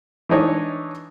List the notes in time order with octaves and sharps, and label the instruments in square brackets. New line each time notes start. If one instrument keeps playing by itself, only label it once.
[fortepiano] E3 D4 D#4 C#5